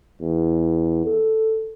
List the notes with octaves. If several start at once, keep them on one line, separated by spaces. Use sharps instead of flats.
E2
A4